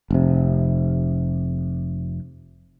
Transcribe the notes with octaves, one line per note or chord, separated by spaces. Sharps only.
F1 C3